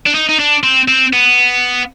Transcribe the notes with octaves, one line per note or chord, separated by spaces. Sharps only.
D4
D#4
D#4
D4
C4
C4
B3